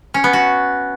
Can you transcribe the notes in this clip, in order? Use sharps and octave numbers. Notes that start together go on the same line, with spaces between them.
C#4
B3
F#4